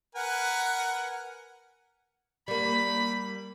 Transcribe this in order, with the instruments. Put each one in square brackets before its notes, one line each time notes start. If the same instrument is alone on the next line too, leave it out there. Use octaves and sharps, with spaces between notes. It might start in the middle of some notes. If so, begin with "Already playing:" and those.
[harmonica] A#4 B4 G#5 [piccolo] F#5
[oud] G3 A#3 [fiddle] B5